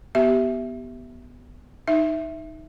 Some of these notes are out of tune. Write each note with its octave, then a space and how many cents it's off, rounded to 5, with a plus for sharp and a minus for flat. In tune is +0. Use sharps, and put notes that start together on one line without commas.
B3 +0 G4 -20 E5 +0
D#4 +0 E5 +0